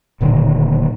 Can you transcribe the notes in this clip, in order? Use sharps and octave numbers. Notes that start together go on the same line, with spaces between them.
D1 A#2 D3 D#3